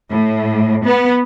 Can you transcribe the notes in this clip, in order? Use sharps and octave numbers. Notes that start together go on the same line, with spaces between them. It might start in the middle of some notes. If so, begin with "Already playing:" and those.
A2
B3